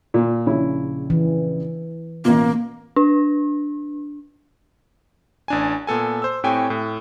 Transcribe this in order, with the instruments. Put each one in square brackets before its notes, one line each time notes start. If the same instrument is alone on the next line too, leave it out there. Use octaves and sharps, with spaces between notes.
[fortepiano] A#2
[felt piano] A#1 C#3 [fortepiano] C#4 E4
[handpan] E3
[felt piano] A1 B2 [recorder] A#3 [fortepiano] F4
[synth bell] D4
[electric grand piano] A1 D4 G#5
A#2 B3 A4 G#5
C5 E6
A2 C4 G4 C#5 G5 G#5
A2